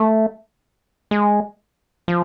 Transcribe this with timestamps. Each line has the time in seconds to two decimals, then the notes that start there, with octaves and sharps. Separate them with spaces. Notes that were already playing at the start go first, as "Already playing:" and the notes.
Already playing: A3
1.11 G#3
2.08 F3